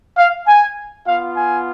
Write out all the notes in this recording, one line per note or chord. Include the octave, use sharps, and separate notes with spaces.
F5
G#5
B3 F4 F5
G#5